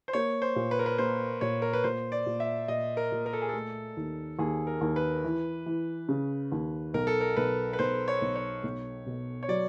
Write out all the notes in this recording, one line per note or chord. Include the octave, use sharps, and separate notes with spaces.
C5
A#3 C#5
C5
A#2
B4
A#4
B4
A#3 C5
A#2 C#5
A#4
B4
A#2 C5
D5
A#2
E5
A#2 D#5
A#4
A#2
A#4
A4
G#4
A3 A4
D#2
D#2 G#4
A#4
D#2
B4
E3
E3
C#3
D#2
B1 A#4
A4
A#4
B1 B4
B4
B1 C5
C#5
B1
C#5
B1
B2
C#5
F#3 D5